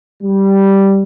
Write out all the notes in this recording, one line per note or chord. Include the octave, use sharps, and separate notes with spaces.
G3